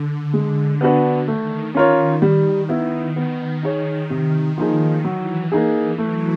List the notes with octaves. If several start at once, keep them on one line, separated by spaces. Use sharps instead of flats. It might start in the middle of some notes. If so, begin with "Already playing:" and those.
Already playing: D3
G#3
B3 D4 F#4 B4
D#3 A3
C#4 F4 A#4 C#5
G3
B3 E4
D#3 B3
D#4 G#4 C#5
C3
F3 A#3 D#4 G#4
E3 F#3
A#3 D#4 G#4
F#3 A3